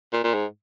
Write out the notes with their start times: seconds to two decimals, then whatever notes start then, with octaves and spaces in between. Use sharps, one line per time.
0.13 A#2
0.24 A#2
0.34 G#2